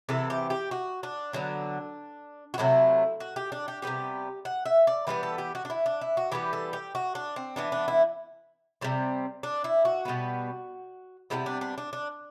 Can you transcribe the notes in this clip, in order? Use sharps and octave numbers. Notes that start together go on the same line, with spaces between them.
C3 E3 B3 A4
G4
G4
F#4
D4
D3 F#3 B3
F#4
C3 F#3 A3 E4
F#4
G4
D4
G4
C3 G3 B3 G4
F#5
E5
D5
E3 G3 B3 B4
A4
G4
F#4
D4
E4
D4
E4
F#4
E3 G3 B3 G4
A4
G4
F#4
D4
C4
E3 B3 D4
D4
E4
C3 G3 C4
D4
E4
F#4
B2 G3 B3
C3 E3 G3 B3 E4
D4
D4
D4
D4